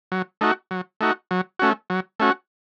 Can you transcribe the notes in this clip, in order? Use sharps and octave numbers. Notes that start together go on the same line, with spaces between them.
F#3
A3 D#4 F#4
F#3
A3 D#4 F#4
F#3
A3 C#4 F#4
F#3
A3 C#4 F#4